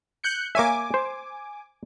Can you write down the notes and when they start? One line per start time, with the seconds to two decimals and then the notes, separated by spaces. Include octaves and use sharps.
0.24 F#6 G6 C#7
0.55 A#3 C#5 E5 G#5 D6
0.94 C5